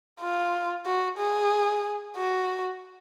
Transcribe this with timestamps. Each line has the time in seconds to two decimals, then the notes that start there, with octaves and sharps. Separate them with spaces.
0.21 F4
0.86 F#4
1.18 G#4
2.16 F#4